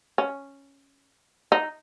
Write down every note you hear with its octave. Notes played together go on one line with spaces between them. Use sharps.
C#4
D#4